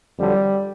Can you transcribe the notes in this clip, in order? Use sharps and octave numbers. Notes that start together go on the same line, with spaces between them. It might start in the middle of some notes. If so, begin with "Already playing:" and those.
F2 D3 F#3 G3